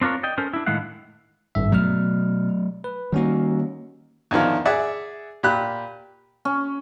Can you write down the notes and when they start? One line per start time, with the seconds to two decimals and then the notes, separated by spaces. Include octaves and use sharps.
0.01 C4 D4 F4 A#4 C#5
0.23 D5 D#5 G5
0.38 C#4 A4 A#4 C5
0.53 D4 E4
0.66 A2 D#3 G#3 E4 F5 F#5
1.55 G#1 G2 E5
1.72 B2 F#3 A3 F6
2.84 B4
3.12 D#3 G3 A#3 C#4 F#4
4.31 E2 D3 D#3 F3
4.65 G#4 D5 E5 F#5
5.43 A#2 G4 B5 F#6
6.45 C#4